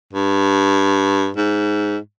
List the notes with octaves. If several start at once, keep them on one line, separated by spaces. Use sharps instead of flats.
G2
G#2